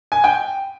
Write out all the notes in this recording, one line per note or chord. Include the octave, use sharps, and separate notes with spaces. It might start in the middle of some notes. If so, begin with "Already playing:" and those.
G#5
G5